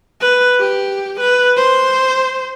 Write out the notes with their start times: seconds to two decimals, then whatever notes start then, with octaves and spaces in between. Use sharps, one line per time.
0.21 B4
0.59 G4
1.20 B4
1.57 C5